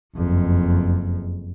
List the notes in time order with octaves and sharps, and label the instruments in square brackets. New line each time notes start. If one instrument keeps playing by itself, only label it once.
[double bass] F#1 F2